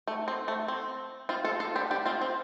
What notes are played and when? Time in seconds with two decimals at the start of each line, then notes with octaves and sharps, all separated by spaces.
0.07 A3
0.28 C4
0.48 A3
0.68 C4
1.29 C4 F4
1.45 F4 A4
1.60 F4 A4
1.76 D4 G4
1.91 D4 G4
2.05 C4 F4
2.21 C4